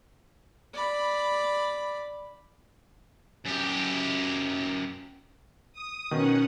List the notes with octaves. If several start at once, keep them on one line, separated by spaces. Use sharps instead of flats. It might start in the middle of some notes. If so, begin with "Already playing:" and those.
D5 B5
F#2 G4
D#6
B2 D#3 C#4 F#5